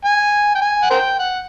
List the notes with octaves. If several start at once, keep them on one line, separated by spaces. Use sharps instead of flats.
G#5
G5
G#5
F#5
A#4 C5 G5
F#5